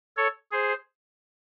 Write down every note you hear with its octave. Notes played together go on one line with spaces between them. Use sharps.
A4 C#5
G#4 C5